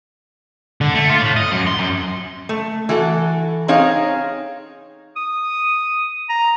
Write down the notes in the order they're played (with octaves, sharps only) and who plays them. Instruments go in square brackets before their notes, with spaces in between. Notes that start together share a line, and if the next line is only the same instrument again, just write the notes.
[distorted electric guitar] D3
A3
F4
A2
D#5
F#2
C6
F#2
[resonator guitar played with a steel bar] A3
E3 F#4 A4
C4 D#4 G#4 C#5 F5
[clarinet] D#6
A#5